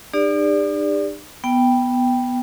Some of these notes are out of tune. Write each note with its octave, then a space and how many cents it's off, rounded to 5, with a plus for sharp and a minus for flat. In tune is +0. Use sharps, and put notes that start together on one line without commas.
D#4 -45 G4 +45 D5 -5
B3 +0 G5 +0